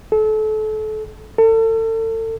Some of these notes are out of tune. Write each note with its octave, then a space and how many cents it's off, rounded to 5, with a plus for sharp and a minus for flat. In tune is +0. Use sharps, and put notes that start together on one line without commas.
A4 -30
A4 +35